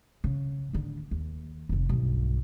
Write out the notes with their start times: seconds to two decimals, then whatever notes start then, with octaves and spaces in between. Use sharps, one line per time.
0.24 C#3
0.73 A2 D3
1.11 D#2
1.69 F1 C3
1.89 B1 G2